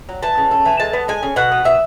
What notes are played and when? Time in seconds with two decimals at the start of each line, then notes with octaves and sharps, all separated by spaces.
0.09 F#3
0.23 E3 A5
0.38 C#3
0.51 A3
0.65 E3
0.79 G#3 A5
0.93 B3
1.08 G#3 G#5
1.23 C#3
1.36 B2 F#5
1.52 B3
1.64 B2 E5